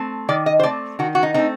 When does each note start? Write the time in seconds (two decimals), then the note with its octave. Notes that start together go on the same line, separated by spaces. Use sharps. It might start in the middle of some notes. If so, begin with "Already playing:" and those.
Already playing: A3 C4
0.29 D#3 D5
0.46 D#5
0.59 C5
0.63 A3 C4 D5
0.99 D#3 F#4
1.15 F#4
1.23 D#4
1.34 A3 C4 D#4